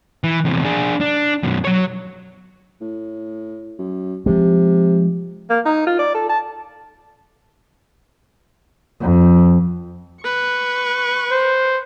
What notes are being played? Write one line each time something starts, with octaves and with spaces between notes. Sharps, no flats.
E3
E2 C3
D4 G#4
D4
F#2 B2
F#3 C#5
A2
F#2
C3 F3 G#3
A#3
D#4
F4
D5
A4
A5
F2
B4 C#6
C5